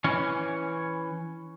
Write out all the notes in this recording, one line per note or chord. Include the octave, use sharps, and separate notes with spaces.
E3 C#4